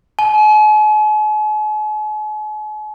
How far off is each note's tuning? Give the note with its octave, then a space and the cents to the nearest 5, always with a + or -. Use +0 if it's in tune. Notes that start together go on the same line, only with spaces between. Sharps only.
G#5 +45